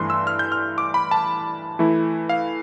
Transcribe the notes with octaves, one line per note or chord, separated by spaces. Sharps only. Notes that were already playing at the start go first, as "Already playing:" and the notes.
Already playing: G2 E3 A3 D4 C6
E6
F6
G6
F6
D6
B5
A5
E3 A3 E4
F5